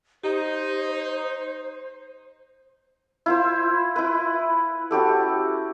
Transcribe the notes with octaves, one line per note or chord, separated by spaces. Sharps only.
D#4 G4 C5
E4 F4 C5
E4 B4
C#4 F#4 G4 A4